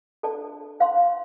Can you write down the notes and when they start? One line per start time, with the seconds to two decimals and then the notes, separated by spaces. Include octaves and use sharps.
0.23 D4 A4 D5 A5
0.80 C5 F5 C6